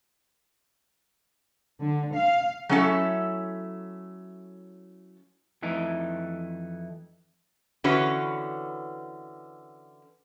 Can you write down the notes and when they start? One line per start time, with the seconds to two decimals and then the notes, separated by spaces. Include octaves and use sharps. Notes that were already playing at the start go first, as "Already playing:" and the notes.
1.81 D3
2.15 F5
2.69 F#3 A3 C#4 E4 A4 E5
5.62 F2 E3 A3 D#4
7.84 D3 E3 C#4 F#4 B4 C#5